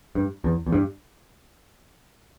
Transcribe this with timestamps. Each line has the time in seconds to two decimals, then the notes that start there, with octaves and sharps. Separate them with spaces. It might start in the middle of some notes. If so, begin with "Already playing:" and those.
0.15 G2
0.44 E2
0.66 E2
0.72 G2